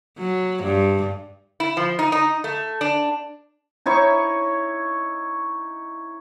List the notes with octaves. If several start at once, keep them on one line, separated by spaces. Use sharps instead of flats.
F#3
G2
E4
F3
D#4
D#4
A3
D4
D#4 E4 C#5 C#6